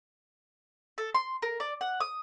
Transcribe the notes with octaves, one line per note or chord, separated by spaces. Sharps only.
A4
C6
A#4
D5
F#5
D#6